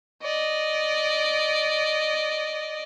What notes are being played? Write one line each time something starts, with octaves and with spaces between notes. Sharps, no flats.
D5 D#5